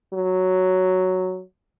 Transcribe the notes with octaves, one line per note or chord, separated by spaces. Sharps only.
F#3